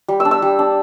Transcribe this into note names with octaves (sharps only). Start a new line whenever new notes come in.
G3
E6
D4
E6
G3
D4